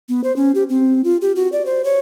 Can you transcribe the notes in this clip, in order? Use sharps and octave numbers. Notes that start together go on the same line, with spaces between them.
B3
C5
C#4
G4
C4
F4
G4
F#4
D5
C5
C#5